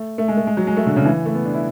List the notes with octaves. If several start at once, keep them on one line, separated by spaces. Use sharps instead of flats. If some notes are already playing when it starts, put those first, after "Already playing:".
Already playing: A3
A3
G#3
A3
G#3
F#3
G#3
A3
D3
C#3
E3
A3
B3
D4
E4